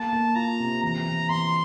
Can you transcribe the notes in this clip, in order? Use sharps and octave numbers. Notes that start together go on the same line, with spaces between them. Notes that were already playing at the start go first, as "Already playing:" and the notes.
Already playing: A#3 A5
A#3
F4 A#5
C3
E3 A#5
E3
E3 C6